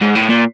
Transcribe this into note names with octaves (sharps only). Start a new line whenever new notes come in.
G#2
A2
A#2